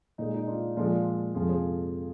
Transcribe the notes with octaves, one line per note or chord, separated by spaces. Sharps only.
A#2 G#3 D#4
D#4
D4 F4
A#2 F3 G#3 D4 F4
F2 C3 F3 G#3 F4 G#4
G#4 C5